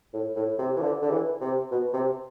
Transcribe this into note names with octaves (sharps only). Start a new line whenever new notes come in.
A2
A2
C3
E3
D3
D3
E3
C3
B2
C3